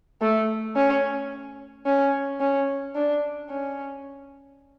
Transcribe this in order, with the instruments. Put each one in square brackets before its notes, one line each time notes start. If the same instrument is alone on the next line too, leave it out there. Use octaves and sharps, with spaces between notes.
[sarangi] A3
C#4
C#4
C#4
D4
C#4